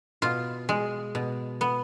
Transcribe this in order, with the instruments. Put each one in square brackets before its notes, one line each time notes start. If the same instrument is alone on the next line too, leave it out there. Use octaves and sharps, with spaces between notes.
[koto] B2 F4
G#3
B2
B3